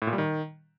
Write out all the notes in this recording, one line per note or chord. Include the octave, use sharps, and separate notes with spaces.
A2
A#2
G3
D#3